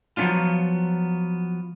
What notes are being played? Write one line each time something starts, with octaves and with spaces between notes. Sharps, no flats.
F3 F#3 B3 C#4 D4 F4